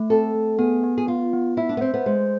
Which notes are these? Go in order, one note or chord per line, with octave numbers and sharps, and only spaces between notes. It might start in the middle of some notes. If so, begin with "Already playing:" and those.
Already playing: A3
C4 A4
A3
B3 G#4
B3
G#4
B3 F4
B3
E4 E5
D4
B3
C4 C5
B3
G#3 C5